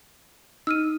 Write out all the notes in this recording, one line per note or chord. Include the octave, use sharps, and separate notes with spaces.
D#4 E6 F6 D#7